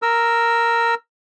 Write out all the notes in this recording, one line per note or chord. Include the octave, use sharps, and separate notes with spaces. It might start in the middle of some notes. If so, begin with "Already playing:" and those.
A#4 E6